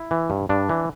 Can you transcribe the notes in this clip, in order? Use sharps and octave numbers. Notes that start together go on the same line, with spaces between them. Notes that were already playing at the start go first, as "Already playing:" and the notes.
Already playing: E4
E3
G2
G2 D4
E3